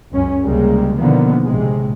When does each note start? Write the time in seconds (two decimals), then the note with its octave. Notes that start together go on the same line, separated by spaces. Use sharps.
0.12 C#2 F#2 C#4
0.45 C#2 C3 G3 G#3 A#3
0.98 B2 D3 D#3 F3 A#3 B3
1.44 A#1 A2 C3 G#3